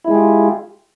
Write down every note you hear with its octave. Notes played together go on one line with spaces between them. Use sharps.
G#3 E4 F4 G4 G#4